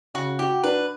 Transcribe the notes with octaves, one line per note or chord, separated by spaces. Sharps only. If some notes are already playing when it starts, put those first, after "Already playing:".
C#3 F#4
F#4 G4
D4 B4